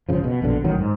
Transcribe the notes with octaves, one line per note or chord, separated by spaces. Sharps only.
G#1 C#3 F3
B2
A#1 B2 D3
A1 D#3 F#3
G#2